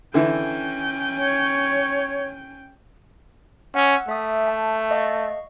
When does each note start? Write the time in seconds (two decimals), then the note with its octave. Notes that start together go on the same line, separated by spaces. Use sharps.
0.14 D3 E3 C#4 G5
1.17 C#5
3.75 C#4 F#5 E6
4.09 A3 E5 D#6
4.48 A5
4.91 D#5 F5 C#6